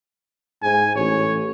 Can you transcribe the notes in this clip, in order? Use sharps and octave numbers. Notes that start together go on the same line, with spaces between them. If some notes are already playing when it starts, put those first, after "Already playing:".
G#2 G#5
A1 C#5